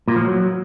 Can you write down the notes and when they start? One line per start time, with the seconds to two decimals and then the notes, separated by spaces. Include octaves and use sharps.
0.08 A#2
0.16 F3
0.25 F#3